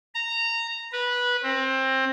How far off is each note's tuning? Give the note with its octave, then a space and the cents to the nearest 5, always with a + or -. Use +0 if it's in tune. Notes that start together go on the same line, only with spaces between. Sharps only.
A#5 -15
B4 -15
C4 +20